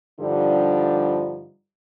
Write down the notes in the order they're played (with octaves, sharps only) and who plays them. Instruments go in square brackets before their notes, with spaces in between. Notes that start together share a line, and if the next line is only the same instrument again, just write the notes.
[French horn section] G2 D3 F3 G3 D#4